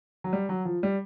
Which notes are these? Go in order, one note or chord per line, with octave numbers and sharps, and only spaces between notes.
F#3
G3
F#3
F3
G3